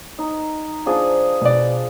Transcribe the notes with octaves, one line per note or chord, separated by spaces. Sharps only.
D#4
F3 D4 G#4
B2 D5